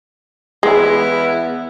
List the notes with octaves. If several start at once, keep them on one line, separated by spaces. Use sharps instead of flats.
E2 G#3 B3 E4